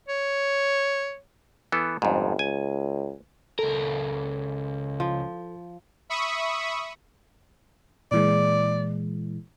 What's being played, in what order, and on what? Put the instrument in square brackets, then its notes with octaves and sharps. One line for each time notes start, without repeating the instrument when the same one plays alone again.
[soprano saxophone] C#5
[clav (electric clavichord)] E3 B3 A4
[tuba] G1 [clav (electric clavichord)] F2 G#2
[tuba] C#2 [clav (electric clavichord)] G#5
[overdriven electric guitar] C#2 A#4 [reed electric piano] A4
[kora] F3
[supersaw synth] E5 B5 C#6 D#6
[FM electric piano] A#2 E3 G#3 [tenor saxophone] D5